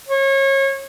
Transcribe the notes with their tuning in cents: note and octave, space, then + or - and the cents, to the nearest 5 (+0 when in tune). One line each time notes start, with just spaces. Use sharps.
C#5 -30